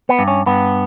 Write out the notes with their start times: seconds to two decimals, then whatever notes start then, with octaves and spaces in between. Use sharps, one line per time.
0.09 B3
0.19 G2
0.28 C#4
0.46 G2 B3